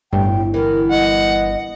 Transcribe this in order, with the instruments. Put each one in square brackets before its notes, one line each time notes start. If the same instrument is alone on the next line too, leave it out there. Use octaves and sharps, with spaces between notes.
[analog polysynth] G1 [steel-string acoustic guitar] A2 [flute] G5
[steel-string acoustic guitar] E3 B3 [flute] A#4
[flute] D#5 [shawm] F#5